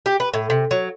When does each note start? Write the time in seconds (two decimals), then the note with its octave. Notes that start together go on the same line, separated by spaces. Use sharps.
0.06 G4
0.20 B4
0.34 A2
0.50 C3
0.71 F#3